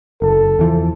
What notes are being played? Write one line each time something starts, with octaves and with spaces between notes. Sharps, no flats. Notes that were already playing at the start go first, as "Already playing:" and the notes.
F#1 A4
E2 E3 F3